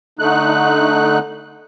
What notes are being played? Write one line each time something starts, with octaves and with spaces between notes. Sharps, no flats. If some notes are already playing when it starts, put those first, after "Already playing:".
D3 A3 D#4 F#6